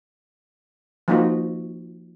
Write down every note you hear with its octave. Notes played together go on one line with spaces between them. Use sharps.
F3 A#3 D#4 F#4